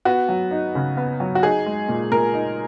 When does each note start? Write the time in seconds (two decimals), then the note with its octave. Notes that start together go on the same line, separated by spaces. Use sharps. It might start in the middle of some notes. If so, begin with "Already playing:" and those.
0.05 B3 F#4
0.29 F#3
0.51 D#4
0.75 C#3
0.97 B3
1.20 F#3
1.35 F#4
1.43 D#4 G#4
1.66 G#3
1.88 A#2
2.11 A#2 A#4
2.34 D#4